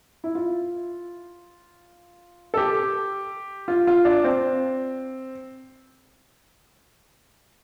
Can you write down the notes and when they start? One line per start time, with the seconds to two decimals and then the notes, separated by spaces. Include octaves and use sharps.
0.24 E4
0.35 F4
2.54 A4
2.57 G4
3.68 F4
3.87 F4
4.05 D4
4.24 C4